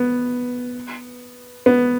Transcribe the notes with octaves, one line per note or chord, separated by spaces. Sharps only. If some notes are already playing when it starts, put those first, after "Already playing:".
Already playing: B3
B3